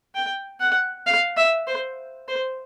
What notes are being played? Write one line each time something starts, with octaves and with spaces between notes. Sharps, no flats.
G5
F#5
F5
E5
C5
C5